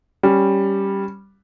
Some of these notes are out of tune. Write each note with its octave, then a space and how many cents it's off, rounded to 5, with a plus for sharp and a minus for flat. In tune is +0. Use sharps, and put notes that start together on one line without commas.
G3 +0 C#4 +0